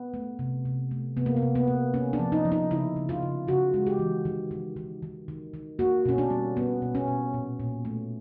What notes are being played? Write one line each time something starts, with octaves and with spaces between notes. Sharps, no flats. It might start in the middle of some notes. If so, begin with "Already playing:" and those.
Already playing: B3
A3
C3
C3
A3
C3 B3
A#3
B3
C3
B3
A#3
A#3 C#4
D4
F3
D#4
F3
D#4
C#3 E4
C#3
F4
C#3
C#3 F#4
G#3
G4
E3
D#3
D#3
D#3
D#3
D#3
D#3
A#3 F#4
B2 C#4
D4
G3
B2 B3
B2
C#4
B2
A#2
A#2
A3